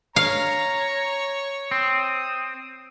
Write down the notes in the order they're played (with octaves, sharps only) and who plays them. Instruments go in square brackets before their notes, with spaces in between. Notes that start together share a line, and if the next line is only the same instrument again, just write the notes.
[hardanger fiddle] C#5 [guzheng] F5 [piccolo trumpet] A#5
[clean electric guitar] C4 [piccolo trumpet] D#6